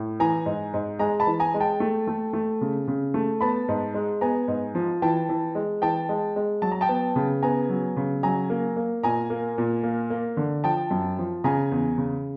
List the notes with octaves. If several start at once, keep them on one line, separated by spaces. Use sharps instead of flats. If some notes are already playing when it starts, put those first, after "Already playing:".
Already playing: A2
E3 G#5 A#5
G#2
G#2
G#3 G#5 A#5
A5 B5
E3
G#5 A#5
G#3
G5 A5
A3
A3
A3
C#3
C#3
A3
B3 A5 B5
G#2
G#3
B3 G#5 A#5
G#2
F3
E3 G5 A5
E3
G#3
E3 G5 A5
G#3
G#3
F#3 A5
A#5
G5 A5
B3
C#3
B3 G#5 A#5
F#3
C#3
F#3 G#5 A#5
A#3
A#3
A#2 G#5 A#5
A#3
A#2
A#3
A#3
D3
F3 G5 A5
F#2
F3
C#3 G#5 A#5
E2
C#3